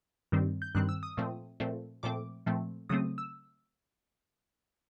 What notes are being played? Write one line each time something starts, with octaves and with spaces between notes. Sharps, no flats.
G2 D#3 G3 C4
G6
G2 D#3 G3 C4 F#6
E6
D#6
A#2 F3 A3 C4
A#2 F3 A3 C4
A#2 F3 A3 C4 D6
A#2 F3 A3 C4
C#3 F#3 A3 C4 D#6
E6